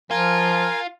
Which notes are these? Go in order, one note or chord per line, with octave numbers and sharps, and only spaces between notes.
F3 F4 A#4 G#5